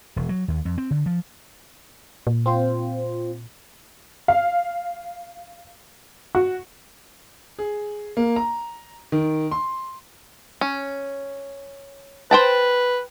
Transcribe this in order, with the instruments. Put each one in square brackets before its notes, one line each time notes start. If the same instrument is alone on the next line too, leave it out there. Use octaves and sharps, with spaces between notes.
[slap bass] E1
F#3
D#2
F2
C4
D3
F3
[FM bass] A#2
[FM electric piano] C4 F4 C5
[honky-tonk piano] F5
F#4
[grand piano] G#4
A#3
A#5
D#3
C6
[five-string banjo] C#4
[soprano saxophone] B4 [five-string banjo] C5 G5 A5